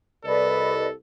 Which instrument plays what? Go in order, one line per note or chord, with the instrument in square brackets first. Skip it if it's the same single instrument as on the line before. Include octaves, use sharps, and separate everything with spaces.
[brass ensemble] C2 A4 [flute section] B4 D5 D#5